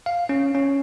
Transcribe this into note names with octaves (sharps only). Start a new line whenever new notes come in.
F5
C#4
C#4